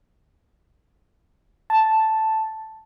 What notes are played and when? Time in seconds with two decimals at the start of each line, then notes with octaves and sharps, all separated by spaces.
1.70 A5